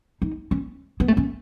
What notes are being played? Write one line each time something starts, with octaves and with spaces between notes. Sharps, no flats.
D#4
C#4
B3
A3
C#4